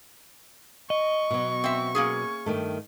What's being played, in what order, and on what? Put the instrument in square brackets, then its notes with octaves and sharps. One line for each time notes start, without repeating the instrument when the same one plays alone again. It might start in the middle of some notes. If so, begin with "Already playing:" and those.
[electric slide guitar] D#5 [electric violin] C#6
[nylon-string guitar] B2 F#3
[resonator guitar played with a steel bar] C4 E5
A#3 C#4 G#4
[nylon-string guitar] G2 D#3 A3